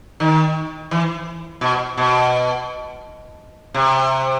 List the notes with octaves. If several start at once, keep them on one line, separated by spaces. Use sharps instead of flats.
D#3
E3
B2
B2
C3